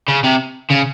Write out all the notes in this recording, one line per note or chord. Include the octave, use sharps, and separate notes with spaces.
C#3
C3
C#3